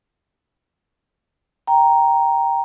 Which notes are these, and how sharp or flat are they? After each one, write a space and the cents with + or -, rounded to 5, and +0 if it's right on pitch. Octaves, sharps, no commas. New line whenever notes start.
G5 +0 A#5 +0